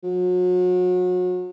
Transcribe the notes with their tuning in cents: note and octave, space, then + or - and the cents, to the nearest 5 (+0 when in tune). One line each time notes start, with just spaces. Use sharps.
F#3 -35